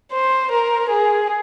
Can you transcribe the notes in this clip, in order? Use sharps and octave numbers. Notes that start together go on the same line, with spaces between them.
C5
A#4
G#4